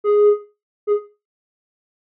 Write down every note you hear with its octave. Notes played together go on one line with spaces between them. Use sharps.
G#4
G#4